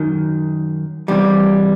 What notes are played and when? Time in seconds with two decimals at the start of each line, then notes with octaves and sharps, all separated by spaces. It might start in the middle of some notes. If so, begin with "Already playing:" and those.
Already playing: F#2 D#3
1.08 E2 C3 E3 F3 G3